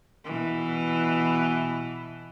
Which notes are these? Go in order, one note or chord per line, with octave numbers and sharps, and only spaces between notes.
B2 E3